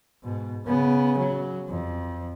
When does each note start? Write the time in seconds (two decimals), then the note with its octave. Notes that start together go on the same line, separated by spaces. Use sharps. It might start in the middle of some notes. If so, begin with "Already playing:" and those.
0.24 G#2 B2
0.67 C#3 B3
1.19 F#3
1.69 F2